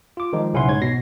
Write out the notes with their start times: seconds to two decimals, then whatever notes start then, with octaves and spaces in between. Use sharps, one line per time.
0.17 F4 D6
0.33 D#3 F3 G#3 D#4
0.53 B1 C#3 C#4 E4 F#5 C6
0.68 G#2 C#5 G#6
0.81 B2 A#6 C7